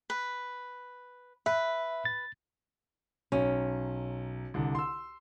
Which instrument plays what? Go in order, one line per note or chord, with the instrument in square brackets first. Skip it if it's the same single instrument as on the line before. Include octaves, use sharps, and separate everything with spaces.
[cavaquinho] B4
[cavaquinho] B4 [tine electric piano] E5
[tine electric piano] A6
[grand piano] B1 [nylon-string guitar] C#4
[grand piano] C2 D3
C6 E6